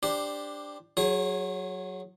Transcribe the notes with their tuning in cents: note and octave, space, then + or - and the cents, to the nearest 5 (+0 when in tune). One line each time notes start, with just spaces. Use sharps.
D4 +0 G4 +15 C5 +0
F#3 +0 G#4 +0 C#5 -40